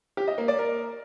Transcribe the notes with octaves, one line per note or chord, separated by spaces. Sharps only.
G4
D#5
A#3
D5
A#4